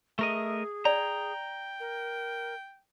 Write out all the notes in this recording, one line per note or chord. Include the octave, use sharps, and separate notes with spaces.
A3 G#4 A#4 D#5 E5
D5 G5 A#5
A#4